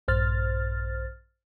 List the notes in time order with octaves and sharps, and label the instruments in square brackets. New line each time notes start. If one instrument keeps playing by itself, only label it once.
[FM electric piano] A#1 G2 C5 F6 A6